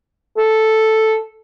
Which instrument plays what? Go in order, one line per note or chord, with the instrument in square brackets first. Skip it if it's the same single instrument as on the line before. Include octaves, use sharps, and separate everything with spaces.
[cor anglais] A4